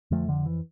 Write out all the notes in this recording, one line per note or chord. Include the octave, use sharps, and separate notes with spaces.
F2 D3 F3 A3
D3 F3
E3